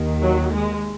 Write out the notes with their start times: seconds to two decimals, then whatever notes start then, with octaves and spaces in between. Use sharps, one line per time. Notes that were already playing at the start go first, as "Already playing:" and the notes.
Already playing: D#2 D#3
0.22 F#3
0.53 G#3